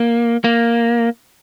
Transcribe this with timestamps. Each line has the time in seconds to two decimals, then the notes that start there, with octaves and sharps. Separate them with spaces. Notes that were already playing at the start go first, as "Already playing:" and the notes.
Already playing: A#3
0.44 A#3